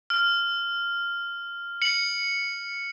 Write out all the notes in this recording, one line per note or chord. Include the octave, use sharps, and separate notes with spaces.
F6
C#7 F#7